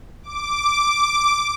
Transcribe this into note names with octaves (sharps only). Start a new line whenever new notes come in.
D6